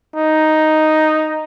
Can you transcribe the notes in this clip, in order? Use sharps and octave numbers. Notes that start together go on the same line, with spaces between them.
D#4